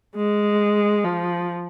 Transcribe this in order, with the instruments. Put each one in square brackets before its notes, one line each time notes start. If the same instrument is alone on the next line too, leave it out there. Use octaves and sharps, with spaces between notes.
[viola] G#3
F3